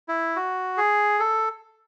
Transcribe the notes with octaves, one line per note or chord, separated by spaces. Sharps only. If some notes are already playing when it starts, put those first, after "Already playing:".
E4
F#4
G#4
A4